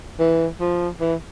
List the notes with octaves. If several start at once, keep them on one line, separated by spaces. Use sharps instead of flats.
E3
F3
E3